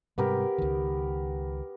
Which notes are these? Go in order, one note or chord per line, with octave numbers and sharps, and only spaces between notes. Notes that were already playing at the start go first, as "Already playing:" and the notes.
G#2 C3 G3 B3 G4 A#4
C#2 D#3